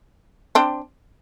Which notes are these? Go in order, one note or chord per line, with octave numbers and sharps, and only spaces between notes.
C4 D4